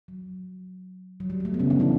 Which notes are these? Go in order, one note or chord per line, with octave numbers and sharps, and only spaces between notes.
F#3
F#3
G3
G3
A3
B3
C#3 C#4
D3 D4
E3 E4